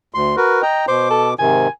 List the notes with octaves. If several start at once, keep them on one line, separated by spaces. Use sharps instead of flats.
D2 C6
F#4 A#4 B4
D#5 G5 A#5
B2 C5 D6
A4
G#2 C3 D#3 G#5